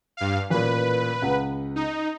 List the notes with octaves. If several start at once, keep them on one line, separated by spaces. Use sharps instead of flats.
G2 F5
A1 A#2 B4
C#2 F#5
D#4